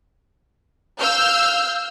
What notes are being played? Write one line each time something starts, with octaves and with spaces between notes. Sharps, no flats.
F5 E6 F6 G6